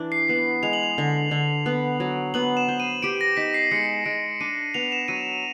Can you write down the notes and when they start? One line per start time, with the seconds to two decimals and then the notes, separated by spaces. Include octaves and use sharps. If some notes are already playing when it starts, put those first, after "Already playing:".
Already playing: E3 D4
0.12 C7
0.28 B3 C7
0.63 G#3 F7
0.73 F#7
0.83 F7
0.98 D3
1.31 D3
1.66 B3
2.00 F#3
2.34 B3 F#7
2.57 E7
2.68 C5
2.80 D#7
3.03 G4 D7
3.21 A#6
3.37 D#4 B6
3.54 C7
3.71 G#3 C#7
4.06 G#3 D7
4.41 D4 D#7
4.74 B3 F7
4.92 E7
5.08 F#3 D#7